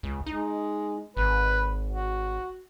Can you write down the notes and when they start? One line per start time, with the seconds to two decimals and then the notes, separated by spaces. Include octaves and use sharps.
0.03 C#2
0.26 G#3 D#4
1.17 G#1 B4
1.88 F#4